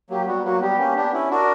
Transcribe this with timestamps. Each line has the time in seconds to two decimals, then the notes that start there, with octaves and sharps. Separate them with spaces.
0.10 F#3 A#3 G4
0.27 G3 B3 F#4
0.45 F#3 A#3 F#4
0.61 G3 B3 G4
0.79 A#3 C#4
0.96 B3 D4
1.13 C#4 E4
1.30 D4 F#4 A#4